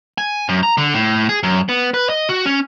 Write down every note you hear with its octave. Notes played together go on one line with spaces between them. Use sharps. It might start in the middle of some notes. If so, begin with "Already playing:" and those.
G#5
F#2
A#5
D3
A2
G#4
F#2
B3
B4
D#5
F#4
C#4